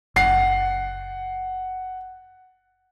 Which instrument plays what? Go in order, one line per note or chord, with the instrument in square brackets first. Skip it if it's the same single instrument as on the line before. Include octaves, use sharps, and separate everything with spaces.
[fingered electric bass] F#1 [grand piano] F#5 C7